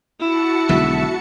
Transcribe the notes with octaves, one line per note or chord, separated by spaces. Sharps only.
E4 F#4 A5 C#7
B1 D3 G#3 E5